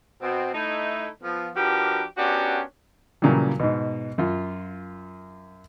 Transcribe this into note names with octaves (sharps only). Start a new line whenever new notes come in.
B2 C4
A3 D#4 E4
F3 B3
F3 D4 F#4 G4 A#4 B4
B3 C#4 D4 F#4 G4 A#4
A#2 C#3 E3 F#3 G3
G#2 B2
F#2 F4